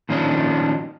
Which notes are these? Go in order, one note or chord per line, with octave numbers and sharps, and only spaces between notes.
A#2 D#3 F3 C#4 D4 D#5